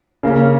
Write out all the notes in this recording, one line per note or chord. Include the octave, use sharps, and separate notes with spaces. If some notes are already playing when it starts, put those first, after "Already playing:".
C#3 A#3 C#4